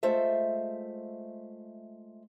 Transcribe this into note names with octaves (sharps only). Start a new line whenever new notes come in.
G#3 A3 F4 C5 E5